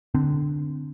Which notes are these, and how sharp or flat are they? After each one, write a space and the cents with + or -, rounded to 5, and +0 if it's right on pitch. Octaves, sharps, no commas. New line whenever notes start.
D3 +0 C4 -25